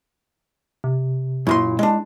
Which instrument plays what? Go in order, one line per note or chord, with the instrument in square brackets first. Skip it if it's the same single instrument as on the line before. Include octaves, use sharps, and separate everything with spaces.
[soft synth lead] C3
[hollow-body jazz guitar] F#2 A#2 C6 [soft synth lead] E4
[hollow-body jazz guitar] G#3 D4